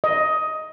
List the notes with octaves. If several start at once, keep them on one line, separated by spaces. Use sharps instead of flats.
D#5